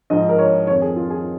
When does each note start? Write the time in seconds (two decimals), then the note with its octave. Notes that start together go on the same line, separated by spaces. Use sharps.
0.10 G#2 F3 D#5
0.29 A#4
0.38 C#5
0.67 D#3 C#5
0.70 F2
0.82 G#4
0.96 F4
1.10 G#4